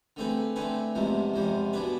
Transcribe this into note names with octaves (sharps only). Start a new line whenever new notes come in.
D3 A3 C4 G#4 B4
D3 A3 C4 G#4 B4
E2 C3 F3 G#3 B3
E2 C3 F3 G#3 B3
B2 B3 D4 G#4 B4